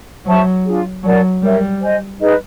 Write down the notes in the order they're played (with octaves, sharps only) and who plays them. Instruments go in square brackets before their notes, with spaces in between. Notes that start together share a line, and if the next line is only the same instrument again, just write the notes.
[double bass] F#3 [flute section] C5 E5 A5 C#6
[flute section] D4 F4 G#4
[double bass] F#3 [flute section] A#4 D5 F#5 A5
[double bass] G3 [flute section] A#4 C#5 E5
[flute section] C5 D#5 G#5
D#4 G#4 B4 D#5